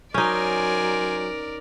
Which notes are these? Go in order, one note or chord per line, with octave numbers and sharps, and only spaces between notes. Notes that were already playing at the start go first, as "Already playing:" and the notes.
F#3 C#4 D#4 A#4 C5 D5 G#5